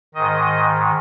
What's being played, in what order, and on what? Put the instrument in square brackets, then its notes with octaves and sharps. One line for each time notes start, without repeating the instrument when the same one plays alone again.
[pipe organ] G#2 D#3 D#5